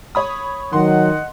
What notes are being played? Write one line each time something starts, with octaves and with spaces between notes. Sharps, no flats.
C#5 B5 D#6
D#3 F#3 D#5 F#5 C6